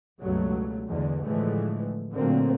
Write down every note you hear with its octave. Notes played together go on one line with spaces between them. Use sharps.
C#2 G2 B2 F#3 A3
E2 D3 G#3
A2 D3 E3 F3 G#3 A3
A#2 D3 F#3 A3 A#3 C4